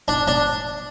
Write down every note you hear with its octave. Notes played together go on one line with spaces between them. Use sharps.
D4
D4